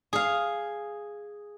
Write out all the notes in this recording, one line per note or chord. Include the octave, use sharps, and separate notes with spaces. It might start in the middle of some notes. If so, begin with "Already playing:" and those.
G#4 F5